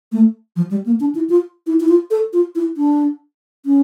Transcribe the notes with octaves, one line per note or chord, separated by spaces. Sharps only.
A3
F3
G3
A#3
D4
E4
F4
E4
E4
F4
A4
F4
E4
D4
C#4